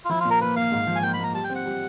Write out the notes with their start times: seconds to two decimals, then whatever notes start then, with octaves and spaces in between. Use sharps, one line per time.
0.05 F4
0.09 F3 E4
0.20 F4
0.25 A#2
0.30 A#4
0.41 A#3 B4
0.56 A#3 F5
0.72 G#2
0.87 F3
0.96 G#5
1.03 A#3 G5
1.14 B5
1.19 A#3 A#5
1.34 G3 A5
1.44 G5
1.50 C4
1.55 F#5
1.65 G3